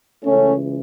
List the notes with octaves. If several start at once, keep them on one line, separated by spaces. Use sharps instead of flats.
C#2 C#3 E3 A3 C#4